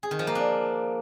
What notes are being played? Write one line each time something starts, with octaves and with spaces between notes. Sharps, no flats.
G#4
D#3
F3
A#3
D4